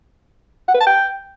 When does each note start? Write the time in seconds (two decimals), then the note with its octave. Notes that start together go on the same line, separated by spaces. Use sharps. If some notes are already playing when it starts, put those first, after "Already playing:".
0.68 F#5
0.74 B4
0.80 A5
0.86 G5